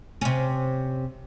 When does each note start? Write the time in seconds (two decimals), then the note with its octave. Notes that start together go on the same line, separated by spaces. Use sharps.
0.21 C3 C#4